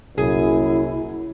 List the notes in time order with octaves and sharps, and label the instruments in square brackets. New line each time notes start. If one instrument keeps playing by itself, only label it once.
[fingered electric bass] C2 A#2 [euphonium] F#2 [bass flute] E4 [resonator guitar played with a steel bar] G#4